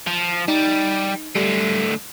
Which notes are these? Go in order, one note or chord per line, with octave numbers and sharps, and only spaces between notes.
F3
G3 D#4
A2 D3 G3